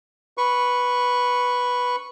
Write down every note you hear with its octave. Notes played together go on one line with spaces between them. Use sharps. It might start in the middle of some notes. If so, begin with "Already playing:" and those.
B4 C#6